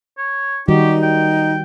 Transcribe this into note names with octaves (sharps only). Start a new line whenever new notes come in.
C#5
D#3 G3 D#4 F#4 G4
G5